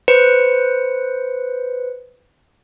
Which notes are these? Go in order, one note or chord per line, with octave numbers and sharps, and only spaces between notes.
B4 C5 C#7